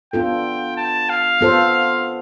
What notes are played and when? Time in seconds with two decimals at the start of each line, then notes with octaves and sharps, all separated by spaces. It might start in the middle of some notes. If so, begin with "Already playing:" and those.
0.13 B3 D4 F4 A4 G5
0.77 A5
1.09 F5
1.41 B3 F4 A4 C5